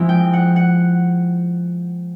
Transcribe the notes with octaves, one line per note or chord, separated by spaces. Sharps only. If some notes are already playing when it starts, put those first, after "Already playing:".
Already playing: F3 G#3 C4 E4
G5
F#5
F#5